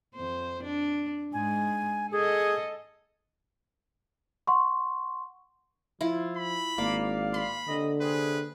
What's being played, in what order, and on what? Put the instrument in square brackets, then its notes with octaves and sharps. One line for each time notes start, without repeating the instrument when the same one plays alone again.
[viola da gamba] F2 C5
D4
[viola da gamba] G#2 G#3 [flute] G#5
[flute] G#4 [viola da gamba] A4 D#5
[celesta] F#5 C6 C#6
[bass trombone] F3 [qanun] E4 F4
[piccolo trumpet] B5
[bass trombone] G#1 [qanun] A#3 [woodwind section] D5 F5
[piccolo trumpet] B5 [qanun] C6
[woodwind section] C2 D#5 [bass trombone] D3
[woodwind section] C3 G#4 [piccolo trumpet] B4